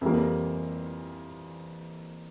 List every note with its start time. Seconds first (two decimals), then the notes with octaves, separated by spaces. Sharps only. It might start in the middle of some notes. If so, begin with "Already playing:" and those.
0.01 F2 E3 G3 A#3